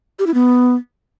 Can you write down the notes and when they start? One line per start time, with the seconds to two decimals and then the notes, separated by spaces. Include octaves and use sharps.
0.19 G4
0.27 E4
0.34 B3